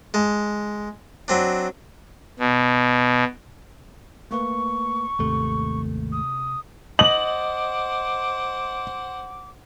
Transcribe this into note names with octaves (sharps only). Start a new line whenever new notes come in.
G#3 A5
F#3 C4 D4
B2
A3 A#3 B4 C#6
G#1 D#2 C3 A3
D#6
C5 D#5 F#5 D6 F#7